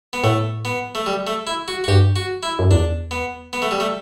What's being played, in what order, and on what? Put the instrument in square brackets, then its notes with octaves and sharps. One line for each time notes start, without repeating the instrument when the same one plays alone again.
[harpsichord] B3
[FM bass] A2 [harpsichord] A3
[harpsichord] B3
A3
G3
A3
E4
F#4
F#4
[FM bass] G2 [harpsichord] G4
[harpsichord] F#4
E4
[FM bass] F#2
[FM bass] E2 [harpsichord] D4
[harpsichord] B3
B3
A3
G3
A3